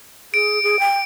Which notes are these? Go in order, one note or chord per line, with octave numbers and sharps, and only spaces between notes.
G#4 D7
G#4
G5